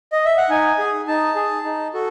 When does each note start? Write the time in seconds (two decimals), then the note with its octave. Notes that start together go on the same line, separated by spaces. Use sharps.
0.12 D#5
0.26 E5
0.38 F#5
0.50 D#4 G#5
0.78 G#4
1.08 D#4 A5
1.36 G#4
1.65 D#4
1.94 F#4 A4